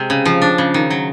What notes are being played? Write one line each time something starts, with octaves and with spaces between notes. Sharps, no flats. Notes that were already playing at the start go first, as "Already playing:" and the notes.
Already playing: C3 G#3
C#3
F3
D4
C#3
D#3
F#3